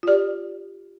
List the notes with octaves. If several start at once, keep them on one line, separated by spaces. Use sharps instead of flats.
F4
G4 D5